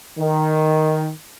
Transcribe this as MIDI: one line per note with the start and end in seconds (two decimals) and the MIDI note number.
0.18 1.10 51